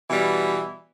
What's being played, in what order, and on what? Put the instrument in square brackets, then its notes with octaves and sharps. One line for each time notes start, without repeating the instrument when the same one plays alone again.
[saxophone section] B2 E3 G3